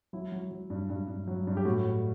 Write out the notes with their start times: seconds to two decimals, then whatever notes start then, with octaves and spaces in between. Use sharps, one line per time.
0.13 F#3 E4
0.32 F#3
0.51 F#3
0.70 G2
0.90 G2
1.08 G2
1.27 F#3
1.47 G2
1.57 G4
1.65 A2 F#4
1.84 A2